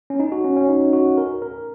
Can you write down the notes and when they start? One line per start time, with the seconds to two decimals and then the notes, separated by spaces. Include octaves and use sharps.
0.10 C#4
0.20 D#4
0.32 F#4
0.44 C#4
0.56 C#4
0.69 D#4
0.93 F#4
1.18 A#4
1.42 A#4